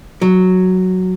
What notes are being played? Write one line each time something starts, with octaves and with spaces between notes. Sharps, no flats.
F#3